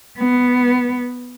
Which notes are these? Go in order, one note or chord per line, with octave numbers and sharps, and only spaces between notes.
B3